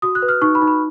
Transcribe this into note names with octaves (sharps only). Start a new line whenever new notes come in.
F#4 D#6
F#6
B4
F6
D#4 C#6
B5
D#4
B5